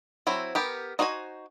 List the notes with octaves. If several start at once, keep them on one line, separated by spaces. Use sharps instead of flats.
F#3 C4 E4
B3 G4 A#4
D#4 F#4 C5 F5 G#5